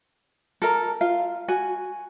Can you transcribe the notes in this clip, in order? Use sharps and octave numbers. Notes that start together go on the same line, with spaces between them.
A4 A#4 A#5
F4 F5
F#4 G#5